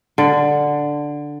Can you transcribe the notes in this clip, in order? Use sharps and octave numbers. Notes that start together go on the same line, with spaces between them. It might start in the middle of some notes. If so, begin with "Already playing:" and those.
D3